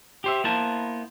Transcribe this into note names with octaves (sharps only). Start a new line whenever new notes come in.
G4 C5 E5
A#3 B3 E4 C5 A5